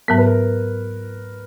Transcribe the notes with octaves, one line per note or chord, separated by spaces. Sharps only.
G#2 F#3 B3 A#4
B4
A#4